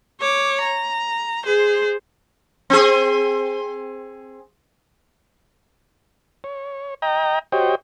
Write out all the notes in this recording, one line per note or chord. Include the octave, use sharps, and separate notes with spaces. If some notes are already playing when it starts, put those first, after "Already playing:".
C#5 D6
A#5
G#4 C5
C4 G#4
C#5
D#5 G5 A#5
F#4 G4 C5 C#5 D#5 G5